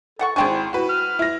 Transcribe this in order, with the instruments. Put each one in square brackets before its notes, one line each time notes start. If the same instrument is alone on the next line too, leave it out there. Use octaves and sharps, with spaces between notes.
[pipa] E3 F#5 C#6 [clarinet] A4
[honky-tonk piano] G#1 C5 G#5 [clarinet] D4 [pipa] G#4 G5 C#6
[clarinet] E4
[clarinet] E4 [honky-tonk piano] F#4 B4
[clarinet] F6
[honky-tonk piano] E4 A#6